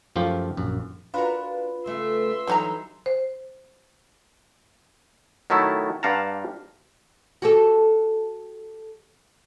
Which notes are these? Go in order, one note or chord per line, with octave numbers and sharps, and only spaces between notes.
F#2 F3 A3 F4 G4
A#1 F#2
D4 F4 F#4 A#4 B4
C#3 A3 E5 C6
D3 E3 F#3 G3 D#4 A#5
C5
D#3 F#3 A3 E4 A4
G2 G4 F5 F#5 A5 A#5
F#4 G4 A4